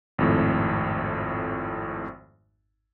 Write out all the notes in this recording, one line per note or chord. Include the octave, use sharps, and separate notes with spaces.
G#1 F2 A2